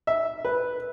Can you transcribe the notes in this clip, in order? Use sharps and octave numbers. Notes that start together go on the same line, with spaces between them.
E5
B4